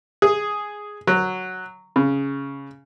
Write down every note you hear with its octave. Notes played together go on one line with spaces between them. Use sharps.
G#4
F#3
C#3